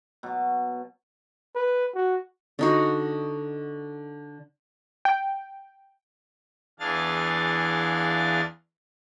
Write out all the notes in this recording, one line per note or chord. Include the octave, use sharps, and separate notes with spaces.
B2 F#3
B4
F#4
D3 D#4 F#4
G5
E2 E3 D4 G#4 F5 A6